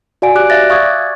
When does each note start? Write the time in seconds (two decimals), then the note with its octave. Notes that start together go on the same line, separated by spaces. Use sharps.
0.22 F#4 D5 F5 G#5 D7
0.35 F#4 G4 D6 F#6 D7
0.50 D5 E5 F5 F#6 A6 A#6
0.70 F5 C#6 D#6 E6 G#6 A6
0.85 D6